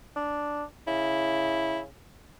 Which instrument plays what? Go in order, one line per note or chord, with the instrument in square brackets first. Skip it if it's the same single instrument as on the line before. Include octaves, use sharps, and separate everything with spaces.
[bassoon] D4
[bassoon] C#3 [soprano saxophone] E4